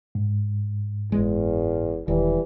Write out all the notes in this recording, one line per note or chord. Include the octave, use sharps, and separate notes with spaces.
G#2
F#1 E2 G#3
E1 D#3 E3 G3